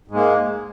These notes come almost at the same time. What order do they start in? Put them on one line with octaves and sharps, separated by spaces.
G#2 G#3 A#3